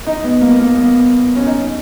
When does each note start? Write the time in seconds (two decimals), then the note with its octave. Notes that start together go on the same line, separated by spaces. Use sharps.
0.07 D#4
0.24 B3
0.41 A#3
0.59 A#3
0.77 B3
1.36 C#4
1.46 D#4